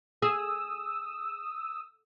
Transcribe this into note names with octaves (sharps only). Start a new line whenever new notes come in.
G#4 D#6 E6